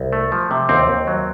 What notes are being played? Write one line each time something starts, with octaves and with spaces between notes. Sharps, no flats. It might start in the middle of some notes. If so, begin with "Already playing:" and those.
Already playing: C2
A3
F3
C3
D#2 C4
D#2
F#3